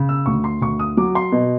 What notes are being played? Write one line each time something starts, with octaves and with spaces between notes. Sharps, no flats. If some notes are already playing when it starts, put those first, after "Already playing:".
Already playing: C#3
E6
D2 C#6
C6
D2 C#6
D#6
F#3 D6
C6
B2